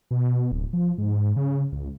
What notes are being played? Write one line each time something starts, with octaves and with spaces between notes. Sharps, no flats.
B2
D1
F3
G#2
C#3
C#2